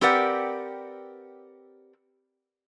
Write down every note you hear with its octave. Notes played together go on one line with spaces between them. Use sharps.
C4 G4 A#4 B4 D5 F#5